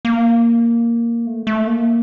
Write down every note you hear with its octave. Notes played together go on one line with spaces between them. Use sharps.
A#3
A3
A3
A#3